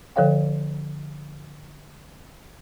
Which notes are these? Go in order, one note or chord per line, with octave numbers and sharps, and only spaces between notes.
D3 F3 A4 C#5 F5 G5